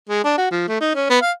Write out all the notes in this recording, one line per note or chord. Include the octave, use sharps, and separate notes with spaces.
G#3
D4
F#4
F3
A3
D#4
C#4
B3
F5